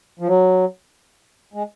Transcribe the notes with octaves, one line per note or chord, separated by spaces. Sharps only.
F3
F#3
G#3